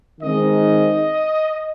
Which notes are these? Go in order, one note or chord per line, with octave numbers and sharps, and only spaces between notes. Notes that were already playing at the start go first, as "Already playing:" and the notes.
D#3 G#3 C4 D#4 D#5